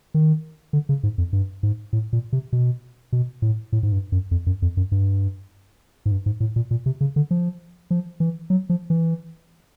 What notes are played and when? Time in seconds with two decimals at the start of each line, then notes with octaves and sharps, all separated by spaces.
0.14 D#3
0.73 D3
0.89 C#3
1.03 G#2
1.18 F2
1.33 G2
1.63 G#2
1.93 A2
2.13 A#2
2.33 C3
2.53 B2
3.12 B2
3.42 A2
3.72 A2
3.83 G#2
3.92 G2
4.12 F#2
4.31 F2
4.46 F#2
4.62 F2
4.77 F#2
4.92 G2
6.06 G#2
6.11 G2
6.26 G#2
6.40 A2
6.56 A#2
6.71 A#2
6.86 C3
7.01 C#3
7.16 D3
7.31 F3
7.91 F3
8.20 E3
8.50 F#3
8.69 F3
8.90 E3